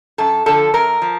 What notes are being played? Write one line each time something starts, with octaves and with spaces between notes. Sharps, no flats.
F#2 A4
D3 F3 A4
F#2 A#4
F3